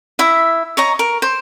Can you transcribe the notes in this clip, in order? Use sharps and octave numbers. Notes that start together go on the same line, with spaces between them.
E4 E5
C#5 D#5 A#5
A#4
C5